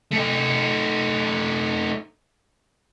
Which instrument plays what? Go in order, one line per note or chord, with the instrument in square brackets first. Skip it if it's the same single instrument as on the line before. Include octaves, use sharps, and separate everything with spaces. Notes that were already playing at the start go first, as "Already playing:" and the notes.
[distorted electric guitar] A3 D#4